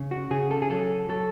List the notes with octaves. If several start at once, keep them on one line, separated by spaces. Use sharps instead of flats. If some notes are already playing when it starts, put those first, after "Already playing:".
Already playing: C#3
F#4
C#3 G#4
A4
G#4
F#3 A4
F#3 A4